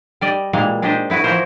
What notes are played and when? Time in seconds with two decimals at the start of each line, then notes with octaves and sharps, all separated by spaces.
0.21 G3 D5 D#5
0.53 A#2 E3 G3 G#3 A#3 F5
0.82 G#3 D4 D#4 G4 C5 D#5
1.10 D#4 E4 F#4 B4
1.24 E3 F3 E4 F#4 A#4 C5